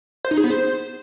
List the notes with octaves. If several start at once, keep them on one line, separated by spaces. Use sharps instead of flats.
C5
D#4
G#4
B3
C5